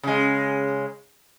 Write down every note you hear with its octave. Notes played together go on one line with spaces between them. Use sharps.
C#3 G#3